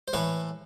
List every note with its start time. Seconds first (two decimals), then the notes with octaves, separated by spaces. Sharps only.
0.08 C5
0.13 A2 E3 A3 B4 C#5